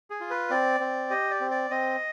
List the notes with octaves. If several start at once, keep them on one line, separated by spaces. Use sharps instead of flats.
G#4
F4
B4
C4 D5
C4
G4 D#5
D5
C4
D5
C4 D#5